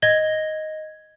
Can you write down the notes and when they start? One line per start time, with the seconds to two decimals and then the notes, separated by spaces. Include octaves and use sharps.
0.02 D#5 G#6 A#6 G7